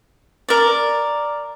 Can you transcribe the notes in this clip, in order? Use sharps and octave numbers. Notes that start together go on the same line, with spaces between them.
A#4 D5